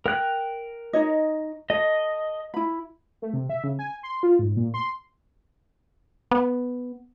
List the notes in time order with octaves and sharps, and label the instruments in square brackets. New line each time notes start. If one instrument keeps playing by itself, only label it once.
[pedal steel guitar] A#4 F#6 [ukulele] G5
[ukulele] D#4 C#5 D#5
[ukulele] A4 [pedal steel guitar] D#5
[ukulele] E4 B5
[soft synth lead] A3
C3
E5
C#3
G#5
C6
F4
G#2
A#2
C6
[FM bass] B3